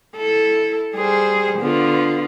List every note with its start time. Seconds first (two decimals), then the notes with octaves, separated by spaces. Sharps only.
0.17 E4 A4
0.95 G3 G#4 C5
1.59 D3 B3 F4